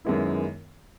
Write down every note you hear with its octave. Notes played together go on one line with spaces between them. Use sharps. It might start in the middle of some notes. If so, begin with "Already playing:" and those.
F#2 D#3 G#3 B3 E4